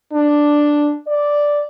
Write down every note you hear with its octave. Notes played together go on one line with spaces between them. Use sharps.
D4
D5